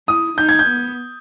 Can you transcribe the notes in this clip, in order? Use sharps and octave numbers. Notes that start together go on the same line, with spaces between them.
E4 D#6
D#4 G6
G#6
G6
B3